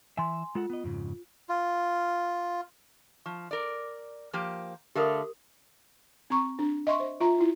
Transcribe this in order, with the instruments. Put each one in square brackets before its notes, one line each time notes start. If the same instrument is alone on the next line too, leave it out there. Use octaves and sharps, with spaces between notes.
[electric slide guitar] E3 E5 [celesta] G#5 C6
[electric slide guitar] G#3 A4 F#5 [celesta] F4
[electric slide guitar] B3 D#5
F2 G#2 C#3
[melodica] F4
[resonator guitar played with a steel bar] F3 [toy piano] C#6
[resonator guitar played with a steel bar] A#4 D5
F3 A#3 G4
[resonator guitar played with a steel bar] D3 A3 F5 [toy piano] G4 A#4 D#6
[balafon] C4 A#5 C#6
D4
D#5 E5 C6 C#6
C5
F4 E5 A#5
E4 F4